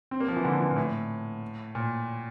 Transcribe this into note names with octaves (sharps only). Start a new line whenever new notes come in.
C4
A#3
F3
E3
D3
E3
A#2
A2
A#2